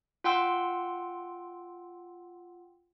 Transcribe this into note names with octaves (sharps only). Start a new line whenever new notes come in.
F4 F#5 G5 C6 E6